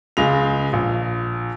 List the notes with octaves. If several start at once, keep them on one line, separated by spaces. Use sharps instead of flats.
C#2 G#3 F7
A#1